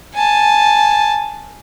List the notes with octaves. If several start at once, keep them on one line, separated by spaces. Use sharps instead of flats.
G#5 A5